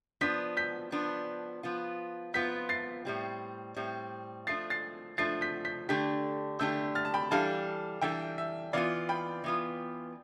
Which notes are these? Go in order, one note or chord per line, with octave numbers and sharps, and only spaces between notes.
F3 B3 D4 G6 B6
G6 B6
F3 B3 D4
F3 B3 F4
F3 B3 F4 G6 B6
A6 C7
A2 G3 C4
A2 G3 C4
F3 A3 D4 A6 C7
A6 C7
F3 A3 D4 A6 C7
G6 B6
G6 B6
D3 A3 D4 G4 G6 B6
D3 A3 D4 G4 E6 G6
F6 A6
A5
G5 B5
E3 G3 D4 A4 F5 A5
E3 G3 D4 A4 E5 G5
E5
E3 B3 F4 D5 F5
G5 B5
E3 B3 F4